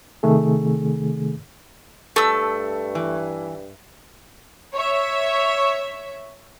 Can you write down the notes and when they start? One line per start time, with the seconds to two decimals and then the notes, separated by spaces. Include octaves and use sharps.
0.23 C3 D#3 A3 G#4
2.16 G2 A3 A4 E6
2.95 E3
4.74 C#5 E5